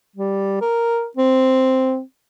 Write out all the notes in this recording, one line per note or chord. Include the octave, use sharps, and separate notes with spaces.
G3
A#4
C4